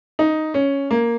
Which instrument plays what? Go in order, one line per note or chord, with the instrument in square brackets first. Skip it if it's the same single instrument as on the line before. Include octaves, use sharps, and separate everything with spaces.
[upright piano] D#4
C#4
A#3